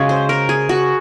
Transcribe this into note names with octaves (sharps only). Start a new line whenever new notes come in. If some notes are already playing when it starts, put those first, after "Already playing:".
Already playing: C#3 G#3 C#4 F#4 G#4
C5
A#4
G#4
F#4